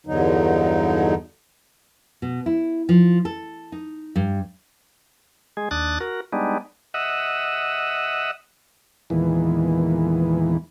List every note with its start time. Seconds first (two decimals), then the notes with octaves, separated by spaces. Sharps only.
0.06 E2 G2 D3 F#3 D#4
2.22 B2
2.46 E4
2.89 F3
3.25 A4
3.72 D#4
4.16 G2
5.57 G#3 G#4
5.71 D#2 D4 D#6 F#6 A6
6.01 F#4 A#4
6.32 G3 G#3 B3 D4 D#4
6.94 D#5 E5 F#5
9.10 E2 A#2 D#3 E3 G#3 B3